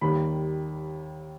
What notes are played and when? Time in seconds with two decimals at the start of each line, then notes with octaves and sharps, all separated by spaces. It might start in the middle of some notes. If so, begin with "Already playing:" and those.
0.01 D#2 D#3 G3 B5